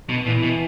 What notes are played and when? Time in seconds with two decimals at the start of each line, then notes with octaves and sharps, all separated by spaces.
0.09 B2
0.26 A#2 E3
0.43 B2